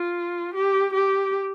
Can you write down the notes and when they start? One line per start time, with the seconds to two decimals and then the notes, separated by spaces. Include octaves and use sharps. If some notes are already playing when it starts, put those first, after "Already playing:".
Already playing: F4
0.54 G4
0.94 G4